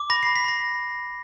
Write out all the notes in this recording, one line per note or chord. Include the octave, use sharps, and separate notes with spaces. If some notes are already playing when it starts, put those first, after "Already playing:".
Already playing: D6
B5 A#6
B5 C7
B6
B5 A#6